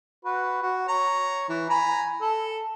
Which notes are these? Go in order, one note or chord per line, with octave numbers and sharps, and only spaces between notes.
F#4 B4
F#4
C#5 A#5
E3
G#5 A#5 B5
A4